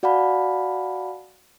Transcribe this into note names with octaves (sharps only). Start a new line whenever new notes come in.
F#4 D5 F5 F#5 A5 B5